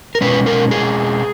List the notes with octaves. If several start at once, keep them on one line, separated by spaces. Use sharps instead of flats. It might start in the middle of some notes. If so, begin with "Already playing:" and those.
A#4
B2 G#3 C#4 B4
A#4
G#4